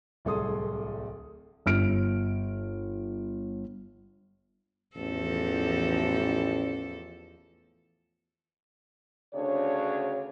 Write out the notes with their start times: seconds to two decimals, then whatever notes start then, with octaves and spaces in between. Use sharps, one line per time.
0.25 D1 C2 G#4 A4 C6 D#6
1.66 G1 F6 D7
4.97 A1 E2 F3 A4
9.34 D2 C#3 D4 C#5